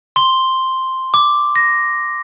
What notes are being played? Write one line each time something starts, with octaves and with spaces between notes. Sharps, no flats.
C6 G7
D6
A#6